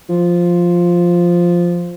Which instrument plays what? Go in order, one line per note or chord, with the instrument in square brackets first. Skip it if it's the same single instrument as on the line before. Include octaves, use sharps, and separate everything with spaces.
[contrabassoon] F3